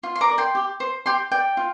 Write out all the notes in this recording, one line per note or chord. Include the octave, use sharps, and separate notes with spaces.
F4
C6
A#5 D6
A#4 D5
G5 C6
G4
C5
G4 G5 C6
D5 G5
F4